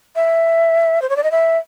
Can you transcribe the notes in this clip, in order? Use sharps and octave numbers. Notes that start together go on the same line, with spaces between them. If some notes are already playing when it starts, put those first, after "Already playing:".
E5
C5
C#5
D5
D#5
E5